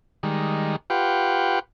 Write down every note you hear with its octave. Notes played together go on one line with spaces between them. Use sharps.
D#3 G3 G#3
F4 G4 B4 F#5 G5